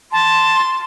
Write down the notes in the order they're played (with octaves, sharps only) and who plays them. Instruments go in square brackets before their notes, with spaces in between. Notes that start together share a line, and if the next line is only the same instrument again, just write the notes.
[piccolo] A5 [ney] C6